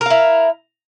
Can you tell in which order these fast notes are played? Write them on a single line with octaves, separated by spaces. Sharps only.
A#4 F5 E4